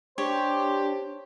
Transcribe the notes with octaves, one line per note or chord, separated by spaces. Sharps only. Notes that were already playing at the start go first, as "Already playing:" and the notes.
D4 G4 C5 C#5